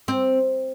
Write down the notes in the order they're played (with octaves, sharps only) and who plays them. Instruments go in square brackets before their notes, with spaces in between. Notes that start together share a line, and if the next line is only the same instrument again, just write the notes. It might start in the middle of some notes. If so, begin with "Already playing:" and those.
[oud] C4